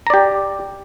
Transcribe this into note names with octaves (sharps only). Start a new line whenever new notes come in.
G4 D5 A#5